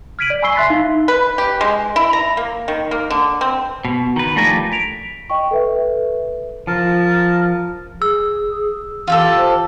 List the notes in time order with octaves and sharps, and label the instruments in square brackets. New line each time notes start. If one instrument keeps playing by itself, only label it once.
[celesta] F6 G#6 B6 D7 D#7 F#7
D5
G#5 B5 C#6 E6 C7 G7
E5 C6 F#6 A6 B6 C7
D#4 F5
[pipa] B4
G4
G#3
E4
A#5
A#3
D#3
A#3
D3
C4
[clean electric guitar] B2
D#3 B4
F3 G3 A3 D4 A#4 G#5
[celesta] B6 D7 F7
D#5 G5 C#6
A4 B4 E5
[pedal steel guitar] F3 [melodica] A#4 A5
[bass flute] G#4 [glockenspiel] E6
[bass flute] E3 [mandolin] F4 G4 A4
[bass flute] C5